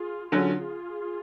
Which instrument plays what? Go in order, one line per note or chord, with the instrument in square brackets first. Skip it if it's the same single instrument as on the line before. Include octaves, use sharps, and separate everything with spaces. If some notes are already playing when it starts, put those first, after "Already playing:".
Already playing: [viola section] F4 G#4
[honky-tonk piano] D3 F#3 C#4 [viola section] F4 G#4